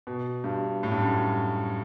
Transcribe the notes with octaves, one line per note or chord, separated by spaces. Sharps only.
B2
G2
A2
G2
F#2